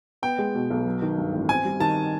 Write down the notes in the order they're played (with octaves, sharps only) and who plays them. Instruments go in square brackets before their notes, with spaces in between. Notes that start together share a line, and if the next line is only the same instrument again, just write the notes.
[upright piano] B3 [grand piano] G5
[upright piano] G#3
B2
B1
F#3
D#3
G2
A1
[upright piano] C4 [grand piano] G#5
[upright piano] G3
[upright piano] D#3 [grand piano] A5